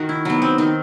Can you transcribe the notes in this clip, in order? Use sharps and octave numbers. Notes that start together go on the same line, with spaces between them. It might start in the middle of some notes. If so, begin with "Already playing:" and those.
Already playing: D#3 F#4
E4
F#3 B3
C4
D#3 C4